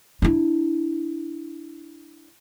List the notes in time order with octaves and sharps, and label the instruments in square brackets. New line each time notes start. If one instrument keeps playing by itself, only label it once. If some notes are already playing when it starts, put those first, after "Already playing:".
[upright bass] D4 E4